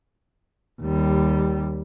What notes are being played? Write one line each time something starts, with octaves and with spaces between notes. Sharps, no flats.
D#2 G3